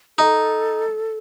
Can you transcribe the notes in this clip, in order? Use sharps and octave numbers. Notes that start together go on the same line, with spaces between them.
D#4 A4